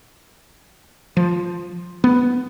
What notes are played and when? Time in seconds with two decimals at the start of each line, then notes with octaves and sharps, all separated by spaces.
1.17 F3
2.04 B3